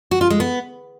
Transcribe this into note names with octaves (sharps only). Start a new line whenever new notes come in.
F#4
F4
G#3
B3